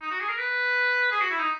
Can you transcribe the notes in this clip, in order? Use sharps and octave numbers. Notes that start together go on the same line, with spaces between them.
D#4
F#4
G#4
A#4
B4
G#4
F#4
E4
D#4